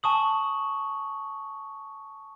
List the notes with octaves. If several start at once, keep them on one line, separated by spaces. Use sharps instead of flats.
G#5 A5 C#6 D#6 F#7